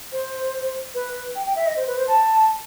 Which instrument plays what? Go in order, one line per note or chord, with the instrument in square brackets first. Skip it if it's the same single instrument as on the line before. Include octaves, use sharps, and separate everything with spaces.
[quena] C5
B4
G5
G5
E5
D#5
C5
B4
C5
A5